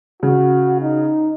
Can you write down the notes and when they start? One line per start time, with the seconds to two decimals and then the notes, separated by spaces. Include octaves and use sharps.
0.23 C#3 F#4
0.81 D#4